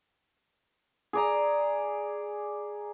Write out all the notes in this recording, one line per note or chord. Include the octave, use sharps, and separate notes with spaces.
G#4 D5 A#5